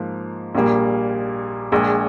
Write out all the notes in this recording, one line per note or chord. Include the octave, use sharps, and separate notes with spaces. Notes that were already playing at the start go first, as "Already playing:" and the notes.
Already playing: G#2 F3 A#3
A#1 A#2 G3 A#3
A#1 A#2 G#3